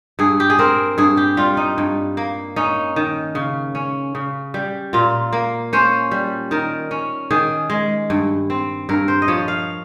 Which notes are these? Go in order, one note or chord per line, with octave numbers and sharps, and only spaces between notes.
G2 G#4
G4
G#4
C4 A#4
G2 G#4
G4
G3 F4
D#4
G2
A#3
C#4 D#4
D#3
C#3
C#4
C#3
G3
A#2 F4
A#3
C#4 C5
G3
D#3 A#4
C#4
D#3 G#4
G#3
G2
C4
G2 A#4
C5
D#5
F3 C#5
F5